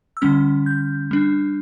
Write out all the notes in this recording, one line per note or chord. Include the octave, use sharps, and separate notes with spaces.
E6
D3 G3 C#4 F6
G6
G3 D4